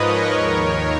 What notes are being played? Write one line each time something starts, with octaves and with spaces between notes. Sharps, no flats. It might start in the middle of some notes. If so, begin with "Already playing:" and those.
Already playing: G#2 F3 A#4 B4 C#5 D#5
D#2 D#3